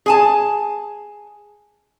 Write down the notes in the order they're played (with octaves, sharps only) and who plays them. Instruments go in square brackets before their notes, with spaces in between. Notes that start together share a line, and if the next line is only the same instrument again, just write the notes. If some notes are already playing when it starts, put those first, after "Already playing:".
[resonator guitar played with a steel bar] G#4 G#5 A5